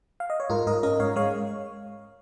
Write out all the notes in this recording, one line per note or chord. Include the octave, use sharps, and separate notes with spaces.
F5
D#5
C#5
G#2 F4 A#4
G#2 A#4 D#5
C#4 A#4 D#5
G#2 C#5 F5
G#3 C#5 F5